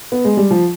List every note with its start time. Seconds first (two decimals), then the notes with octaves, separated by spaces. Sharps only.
0.12 B3
0.25 G#3
0.37 G3
0.51 F3